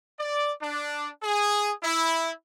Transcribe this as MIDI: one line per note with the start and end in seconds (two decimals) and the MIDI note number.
0.20 0.52 74
0.61 1.09 62
1.22 1.71 68
1.83 2.31 64